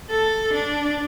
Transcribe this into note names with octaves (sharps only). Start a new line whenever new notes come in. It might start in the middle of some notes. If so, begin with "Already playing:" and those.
A4
D4